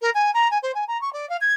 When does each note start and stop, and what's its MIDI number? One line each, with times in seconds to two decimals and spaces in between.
0.01 0.10 70
0.14 0.30 80
0.34 0.50 82
0.50 0.58 80
0.62 0.71 72
0.74 0.84 80
0.87 0.99 82
1.01 1.12 85
1.12 1.28 74
1.29 1.36 77
1.40 1.54 92